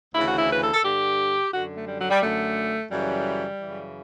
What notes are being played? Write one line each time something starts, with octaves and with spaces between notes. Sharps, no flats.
D2 C#3 E3 E4
F#4
E4
B4
A4
A4
G2 D3 G4
F#2 D3 F#4
A3
G3
F#3
G3
F#2 D3 A3
F#2 C#3 E3 G3
F#2 C#3 E3